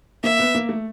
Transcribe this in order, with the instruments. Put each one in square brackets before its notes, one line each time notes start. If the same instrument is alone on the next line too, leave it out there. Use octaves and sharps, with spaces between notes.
[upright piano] A#3 [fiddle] E5
[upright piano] B3
A#3
A3